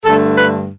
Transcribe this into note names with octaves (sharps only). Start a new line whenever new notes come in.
G2 D3 A3 A4
B4